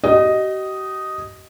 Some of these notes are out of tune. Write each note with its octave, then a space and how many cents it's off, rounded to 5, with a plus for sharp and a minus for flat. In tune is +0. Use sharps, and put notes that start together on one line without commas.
G4 -45 D#5 +0